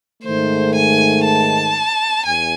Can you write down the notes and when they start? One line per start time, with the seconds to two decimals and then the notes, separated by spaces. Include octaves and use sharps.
0.23 G#2 D#3 A3 C5
0.75 G#5
1.25 A5
2.25 E2 G#5